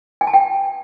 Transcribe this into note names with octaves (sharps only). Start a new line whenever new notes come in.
G#5
A5
G5